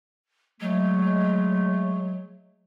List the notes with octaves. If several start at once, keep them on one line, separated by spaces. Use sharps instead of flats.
F#3 G#3 A3